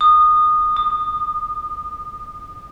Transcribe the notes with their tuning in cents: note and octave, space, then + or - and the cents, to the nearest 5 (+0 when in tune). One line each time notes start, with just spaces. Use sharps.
D#6 -20
D#6 -40